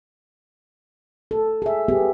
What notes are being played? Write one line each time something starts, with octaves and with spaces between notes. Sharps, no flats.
A4
G#4 E5
B3 G4 G#4